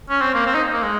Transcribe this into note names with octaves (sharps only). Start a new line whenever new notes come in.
C#4
C4
A#3
C4
D#4
A#3
G#3